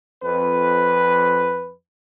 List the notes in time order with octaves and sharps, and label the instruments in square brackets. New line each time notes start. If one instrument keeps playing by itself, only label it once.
[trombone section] F2 B4